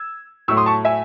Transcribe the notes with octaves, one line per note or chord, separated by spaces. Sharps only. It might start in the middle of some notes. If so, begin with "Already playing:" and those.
Already playing: E6 G#6
A2 F#3 A3 C#6 E6
C6 D#6
A5 C#6
E5 G#5